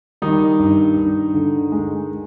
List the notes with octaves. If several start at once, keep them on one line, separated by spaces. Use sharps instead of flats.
D#3 G3 D#4
G2
G2
D3
G#3